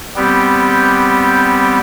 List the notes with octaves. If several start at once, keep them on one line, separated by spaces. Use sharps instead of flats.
G3 B3 C4 G4